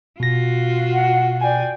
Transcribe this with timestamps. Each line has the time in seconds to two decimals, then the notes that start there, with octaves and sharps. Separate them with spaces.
0.20 B2 F4 F#4 A#6
0.94 F#5
1.41 D5 G5 G#5